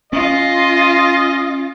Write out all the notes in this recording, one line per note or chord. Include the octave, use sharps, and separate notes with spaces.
C#4 F4 D#5